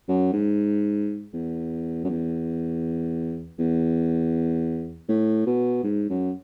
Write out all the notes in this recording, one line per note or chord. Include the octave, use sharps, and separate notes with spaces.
F#2
G#2
E2
F#2
E2
E2
A2
B2
G#2
F#2